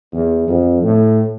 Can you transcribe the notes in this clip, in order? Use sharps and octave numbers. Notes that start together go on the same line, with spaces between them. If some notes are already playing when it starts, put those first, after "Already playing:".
E2
F2
A2